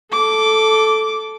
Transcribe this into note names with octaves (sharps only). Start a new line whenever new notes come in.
A4 D6